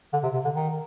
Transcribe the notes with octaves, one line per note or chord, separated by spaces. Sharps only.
D3
C3
C3
D3
D#3